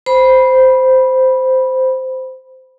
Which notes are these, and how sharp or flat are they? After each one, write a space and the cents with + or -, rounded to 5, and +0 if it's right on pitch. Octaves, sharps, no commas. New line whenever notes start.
C5 -10 B5 -10